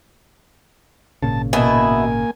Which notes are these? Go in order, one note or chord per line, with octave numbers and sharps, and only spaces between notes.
G#1 A#2 C#3 A5
B2 A#3 E4 G#5